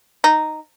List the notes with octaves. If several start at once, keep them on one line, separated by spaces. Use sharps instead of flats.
D#4